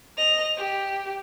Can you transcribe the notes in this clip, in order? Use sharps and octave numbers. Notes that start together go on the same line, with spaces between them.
D#5 F7
G4